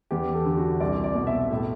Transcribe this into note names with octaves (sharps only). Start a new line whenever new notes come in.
E2 G4
A4
D3
F#4
C2 D5
D5
B2
E5
A2 E5